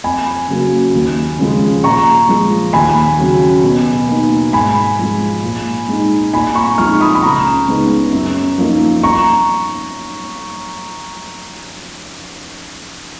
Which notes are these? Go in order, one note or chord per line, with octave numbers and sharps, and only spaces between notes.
F2 G#5 B5
C#3 F#3 A#3
D#2
C#3 F3 G#3
A#2 A#5 C#6
F3 G#3
D#2 G#5 B5
C#3 F#3
B2
A#3 D#4
G#2 G#5 B5
F3 G#3
A#2
G#3 D#4
A#2 G#5 B5
A#5 C#6
F3 G#3 D#4 C#6 F6
B5 D#6
B5
C#2 A#5 C#6
C#3 G#3 B3 D#4
F#2
F3 A#3 D#4
A#5 C#6